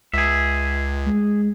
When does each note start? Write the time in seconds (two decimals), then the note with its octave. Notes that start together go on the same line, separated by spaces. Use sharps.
0.14 C#2 G#4 E5
1.07 G#3